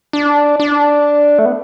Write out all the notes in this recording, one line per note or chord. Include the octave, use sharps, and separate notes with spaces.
D4
D4
A3
B3